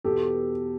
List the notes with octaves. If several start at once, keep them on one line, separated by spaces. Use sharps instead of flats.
E2 B2 G4 A4